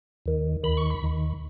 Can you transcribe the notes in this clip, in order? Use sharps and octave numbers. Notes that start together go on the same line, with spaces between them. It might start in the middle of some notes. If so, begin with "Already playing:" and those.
D#2 D#3
D#2 D#3 B5
C#6
B5
D#2 D#3